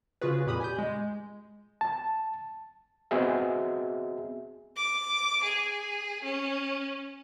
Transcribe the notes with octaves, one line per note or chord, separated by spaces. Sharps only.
C#3 F4 F#4 G#4 B4
F2 A#2 G4 B5 D#6
G#5 G6
G#3
A5
B3 C4 F#4 G#4 D#5 E5
D6
G#4
C#4